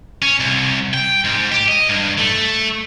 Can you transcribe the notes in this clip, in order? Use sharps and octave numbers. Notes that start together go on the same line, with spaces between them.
C#4
C2
G5
G#2
G4
D#5
G2
A3